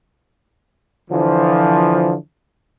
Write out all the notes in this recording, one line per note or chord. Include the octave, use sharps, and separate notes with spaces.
D3 E3 F3